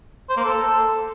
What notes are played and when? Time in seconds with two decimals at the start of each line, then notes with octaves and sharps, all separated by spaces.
0.29 C5
0.37 A#3
0.45 A4